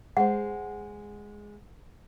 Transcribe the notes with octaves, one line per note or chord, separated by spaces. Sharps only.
G#3 C5 F#5